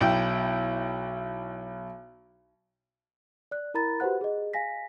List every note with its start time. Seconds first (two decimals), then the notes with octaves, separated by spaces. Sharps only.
0.01 B1 E4 G5
3.51 D5 F#6
3.74 E4 A#4 A#5 B5 A6
4.00 F#4 G4 B4 C5 F#5 F#6
4.21 G#4 D#5
4.53 F5 G#5 A#6 B6